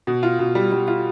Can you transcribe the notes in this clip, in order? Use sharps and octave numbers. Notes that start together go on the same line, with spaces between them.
B2
F4
B2
G3
G3
F4